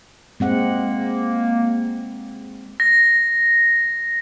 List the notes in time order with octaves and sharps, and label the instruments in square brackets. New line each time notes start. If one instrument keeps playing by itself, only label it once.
[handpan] G#3 C4 F#5 [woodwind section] A#3
[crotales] A#6